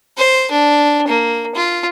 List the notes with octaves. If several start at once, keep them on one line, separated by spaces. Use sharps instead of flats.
C5
D4
A#3
F4